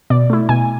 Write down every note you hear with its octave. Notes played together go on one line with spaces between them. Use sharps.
B2 D5
A3 E4
B2 G#5